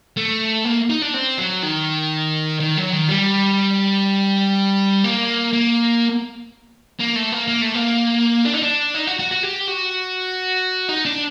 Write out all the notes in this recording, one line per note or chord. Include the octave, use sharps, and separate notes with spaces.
A3
A#3
D#4
D4
C4
F#3
D#3
D#3
F#3
D#3
G3
A#3
A#3
A#3
A3
A#3
A#3
A3
A#3
D4
D#4
D4
D#4
F#4
F#4
F#4
G4
F#4
D#4
D4